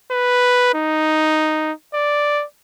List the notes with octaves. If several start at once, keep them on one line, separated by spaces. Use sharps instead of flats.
B4
D#4
D5